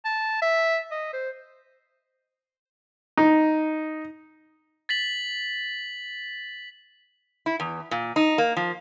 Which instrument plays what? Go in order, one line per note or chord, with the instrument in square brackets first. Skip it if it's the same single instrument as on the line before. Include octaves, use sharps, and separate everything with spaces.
[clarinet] A5
E5
D#5
C5
[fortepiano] D#4
[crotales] A6 B6 F#7
[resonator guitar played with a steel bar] E4
E2
A#2
D#4
A#3
F3